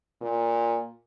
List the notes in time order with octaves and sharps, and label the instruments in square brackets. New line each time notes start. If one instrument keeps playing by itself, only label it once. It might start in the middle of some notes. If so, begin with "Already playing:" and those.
[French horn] A#2